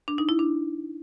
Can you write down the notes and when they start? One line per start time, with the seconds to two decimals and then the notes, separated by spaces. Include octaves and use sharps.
0.08 D4
0.18 D#4
0.29 E4
0.39 D4